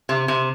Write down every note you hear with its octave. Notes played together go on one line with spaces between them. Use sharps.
C3
C3